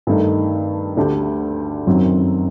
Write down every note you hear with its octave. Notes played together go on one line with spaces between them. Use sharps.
G2 D#3 A3 D#4 A4
D2 D3 A3 D4 G4
F#2 D#3 F#3 C4